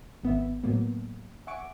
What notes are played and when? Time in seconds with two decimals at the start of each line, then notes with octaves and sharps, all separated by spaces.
0.23 G#1 B3 B4 E5
0.64 A2 F#3 A#3 B3
1.47 E5 F#5 G#5 C#6 D6 D7